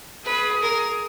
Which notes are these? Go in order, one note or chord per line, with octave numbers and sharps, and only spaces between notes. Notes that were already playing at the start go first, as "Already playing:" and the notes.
G#4 B4
A#4